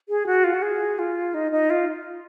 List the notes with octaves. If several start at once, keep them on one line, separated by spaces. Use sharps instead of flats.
G#4
F#4
F4
F#4
G#4
F4
D#4
D#4
F4